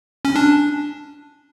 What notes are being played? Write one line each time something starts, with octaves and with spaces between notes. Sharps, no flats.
C#4
D4